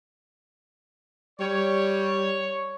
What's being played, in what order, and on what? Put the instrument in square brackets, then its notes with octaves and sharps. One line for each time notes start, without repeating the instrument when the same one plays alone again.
[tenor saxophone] G3 [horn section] C#5